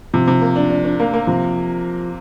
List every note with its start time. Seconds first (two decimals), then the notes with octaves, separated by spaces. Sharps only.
0.14 C3 F3
0.27 C3
0.41 A#3
0.56 D4
0.70 D4
0.85 D4
1.00 A#3
1.13 A#3
1.27 C3 F3